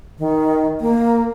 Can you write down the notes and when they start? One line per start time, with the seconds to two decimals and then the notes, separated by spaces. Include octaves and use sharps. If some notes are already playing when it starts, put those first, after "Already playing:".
0.19 D#3
0.81 A#3